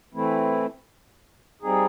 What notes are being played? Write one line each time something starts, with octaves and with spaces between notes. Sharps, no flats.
E3 A3 C4 E4
G3 C4 D#4 G#4